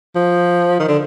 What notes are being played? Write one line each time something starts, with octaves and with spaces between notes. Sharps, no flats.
F3
D#3
D3